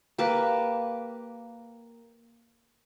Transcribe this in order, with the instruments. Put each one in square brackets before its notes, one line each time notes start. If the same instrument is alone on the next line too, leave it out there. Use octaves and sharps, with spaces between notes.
[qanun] A#3 G4 B4 A5